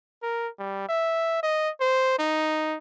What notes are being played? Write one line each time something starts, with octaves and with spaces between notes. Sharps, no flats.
A#4
G3
E5
D#5
C5
D#4